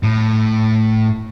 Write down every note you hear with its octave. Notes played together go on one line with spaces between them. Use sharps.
A2